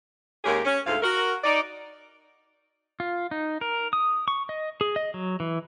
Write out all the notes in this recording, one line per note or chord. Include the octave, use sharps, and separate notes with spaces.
D#2 G#3 A#3 C#4 G4 G#4
C#4
D2 G#2 A3 F4 F5
F#4 A#4
D#4 D5
F4
D#4
A#4
D#6
C#6
D#5
G#4
D#5
F#3
E3